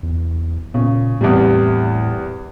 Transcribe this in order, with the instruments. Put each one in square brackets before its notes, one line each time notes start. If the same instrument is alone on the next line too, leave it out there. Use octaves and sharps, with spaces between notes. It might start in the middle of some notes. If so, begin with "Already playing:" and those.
[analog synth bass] E2
[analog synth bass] A#2 [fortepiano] C#3
[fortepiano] E2 C3 G3 [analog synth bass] A2